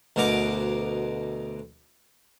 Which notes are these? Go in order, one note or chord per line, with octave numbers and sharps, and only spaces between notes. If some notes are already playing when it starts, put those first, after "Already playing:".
D2 B2 D3 A#4 D6